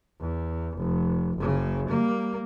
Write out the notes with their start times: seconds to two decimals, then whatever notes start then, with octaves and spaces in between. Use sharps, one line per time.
0.20 E2
0.77 F1
1.37 F#1 C#3
1.88 G3 A#3